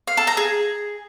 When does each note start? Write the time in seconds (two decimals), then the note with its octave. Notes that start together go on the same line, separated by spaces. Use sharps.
0.07 F5
0.17 A4
0.27 A#5
0.37 G#4